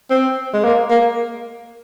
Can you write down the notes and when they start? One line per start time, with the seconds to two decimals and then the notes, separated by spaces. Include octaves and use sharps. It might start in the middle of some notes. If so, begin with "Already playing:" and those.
0.10 C4
0.53 G#3
0.64 A#3
0.90 A#3